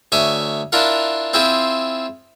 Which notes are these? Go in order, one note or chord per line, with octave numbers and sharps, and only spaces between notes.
D2 C#5 E5 G#5 D6
D4 E4 F4 A#4 F5 F#5
C4 E4 F4 G#4 C5